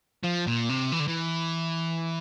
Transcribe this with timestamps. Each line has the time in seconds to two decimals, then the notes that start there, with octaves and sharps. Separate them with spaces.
0.24 F3
0.47 A#2
0.69 C3
0.92 E3
1.00 D3
1.07 E3